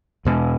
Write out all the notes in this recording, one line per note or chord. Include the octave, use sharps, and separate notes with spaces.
E2 B2 G#3